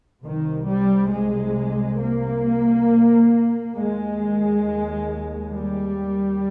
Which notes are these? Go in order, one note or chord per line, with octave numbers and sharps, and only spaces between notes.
C2 C3 D#3
G3
G#3
A#3
D#2 G#3
G3